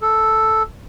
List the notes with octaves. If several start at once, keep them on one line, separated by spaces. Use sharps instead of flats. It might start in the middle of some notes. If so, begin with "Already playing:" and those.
A4